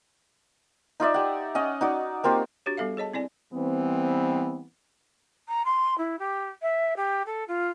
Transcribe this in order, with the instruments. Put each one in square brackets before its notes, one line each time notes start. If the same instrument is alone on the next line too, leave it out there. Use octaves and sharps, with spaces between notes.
[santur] D#4 F4 D5 E5
G4 F#5
C#4 D#5 F#5
D#4 F#4 D5
A#3 C4 F4 G4
[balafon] D4 F#4 G4 C#5
G3 B3 A4 E5 F5
G#4 C#5 D#5 A5
C4 E4 D5 G#5
[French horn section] E3 G3 B3 C4
[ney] A#5
C6
E4
G4
E5
G4
A4
F4